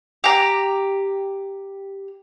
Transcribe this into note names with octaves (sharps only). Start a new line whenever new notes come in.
G4 A#5